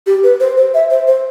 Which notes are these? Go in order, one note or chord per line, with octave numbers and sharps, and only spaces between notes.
G4
B4
C5
C5
E5
C5
C5